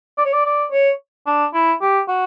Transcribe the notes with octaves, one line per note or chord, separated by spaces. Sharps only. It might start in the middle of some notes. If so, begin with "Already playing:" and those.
D5
C#5
D5
D5
C#5
D4
E4
G4
F#4